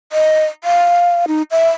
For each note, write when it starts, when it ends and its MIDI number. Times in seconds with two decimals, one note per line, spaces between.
0.12 0.45 75
0.64 1.25 77
1.28 1.42 63
1.51 1.67 76